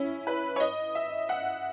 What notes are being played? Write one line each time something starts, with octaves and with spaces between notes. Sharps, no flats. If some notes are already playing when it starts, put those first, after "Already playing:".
Already playing: C#4 E4
B4
C#5
D#5
E5
F#5